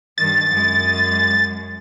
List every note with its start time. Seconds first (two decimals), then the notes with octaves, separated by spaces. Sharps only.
0.18 G2 D#3 A6
0.50 F#2 G#3